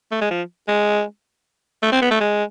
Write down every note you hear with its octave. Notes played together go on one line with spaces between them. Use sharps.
A3
G#3
F3
G#3
A3
C4
B3
A3
G#3